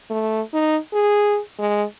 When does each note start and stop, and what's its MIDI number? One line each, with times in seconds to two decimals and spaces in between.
0.10 0.41 57
0.54 0.77 63
0.93 1.39 68
1.59 1.84 56